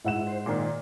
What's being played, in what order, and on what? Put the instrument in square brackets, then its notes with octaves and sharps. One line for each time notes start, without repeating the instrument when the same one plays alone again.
[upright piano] G#2 F#5 E7 [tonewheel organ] E4
[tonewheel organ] C5
[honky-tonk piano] A#2 D#3